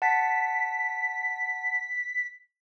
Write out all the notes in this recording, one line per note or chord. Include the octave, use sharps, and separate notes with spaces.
F#5 A5 A6 B6